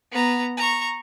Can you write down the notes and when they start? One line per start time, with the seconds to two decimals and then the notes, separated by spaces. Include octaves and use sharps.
0.12 B3 A#5
0.57 A#5 C#6